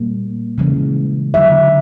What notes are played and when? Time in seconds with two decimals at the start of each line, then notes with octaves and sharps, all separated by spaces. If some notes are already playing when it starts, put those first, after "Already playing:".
Already playing: A#2 G3 A#3
0.58 C#3 E3 G#3
1.34 D3 F#3 A3 E5